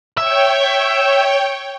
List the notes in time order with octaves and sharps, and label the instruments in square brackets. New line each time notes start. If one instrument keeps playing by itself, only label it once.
[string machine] C#5 G5 [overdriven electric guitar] E5